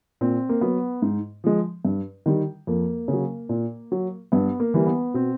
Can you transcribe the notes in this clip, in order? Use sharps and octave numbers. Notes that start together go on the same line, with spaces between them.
A#2 C4
A#3
F#3 B3
G#2
F3 G#3
G2
D#3 G3
F2 A#3
C#3
F#3
A#2
F#3
G2 B3
A#3
E3 G3
B3
B2 C4